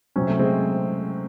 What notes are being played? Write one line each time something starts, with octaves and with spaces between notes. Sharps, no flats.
C3 F#3 C4 C#4
A3
G#3 C4